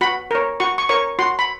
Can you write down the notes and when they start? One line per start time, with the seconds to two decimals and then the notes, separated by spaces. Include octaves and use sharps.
0.01 F#4 B5
0.31 A#4 C#5
0.60 F#4 C#6
0.78 C#6
0.89 A#4 C#5 C#6
1.19 F#4 C6
1.39 B5